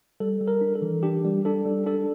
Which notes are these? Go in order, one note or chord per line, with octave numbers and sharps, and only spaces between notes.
G3 A4
G3
A#4
D4
A4
E3
D4 G4
G3
D4 A4
G3
D4 A4